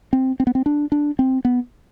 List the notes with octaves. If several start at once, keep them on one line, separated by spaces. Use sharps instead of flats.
C4
C4
B3
C4
D4
D4
C4
B3